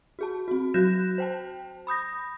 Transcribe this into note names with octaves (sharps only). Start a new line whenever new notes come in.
F#4 G#4 A5
C4 F#4
F#3 F#4 F#6 G6 A#6 E7
C5 G5 A5
B5 D#6 G6 A#6